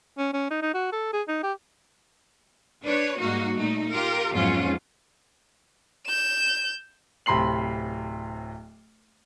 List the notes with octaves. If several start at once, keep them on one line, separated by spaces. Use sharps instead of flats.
C#4
C#4
D#4
D#4
F#4
A4
G#4
D#4
G4
D4 B4 C#5
G#2 G3 A#3 D#4 F#4
A#2 A3 D#4
F4 G4 A#4
F2 G#2 F#3 B3 C#4 F4
G6 E7
D1 C3 B5 C6 C7 F#7